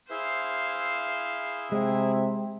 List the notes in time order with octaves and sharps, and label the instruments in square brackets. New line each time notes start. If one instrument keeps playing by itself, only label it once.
[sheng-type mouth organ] E4 G#4 E5 [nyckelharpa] C5 F5
[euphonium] C3 [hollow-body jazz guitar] G#3